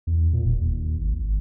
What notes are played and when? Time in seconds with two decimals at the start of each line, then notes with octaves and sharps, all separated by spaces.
0.07 E2
0.33 A#2
0.45 E1
0.61 D#2
1.01 G#1
1.14 G#1